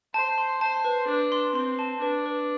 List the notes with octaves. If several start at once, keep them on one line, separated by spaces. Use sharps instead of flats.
C5 A5
C6
C5 A5
B4
D4 B4
C6
C4 C6
A5
D4 B4
B4